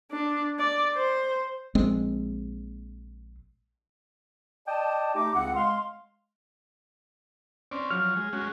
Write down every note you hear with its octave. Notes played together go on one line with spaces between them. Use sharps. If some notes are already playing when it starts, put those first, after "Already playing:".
D4
D5
C5
A#1 G#3 C4
D5 D#5 G5 A5
A3 D#4 G4 D6
C#2 C#3 C4 F#5
G#3 F5 C6
C4 C#4 D5
F3 F#3 C#5 F6
G#3
G#3 C#4 F#4